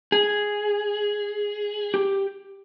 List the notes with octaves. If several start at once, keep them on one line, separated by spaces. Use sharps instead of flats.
G#4
G4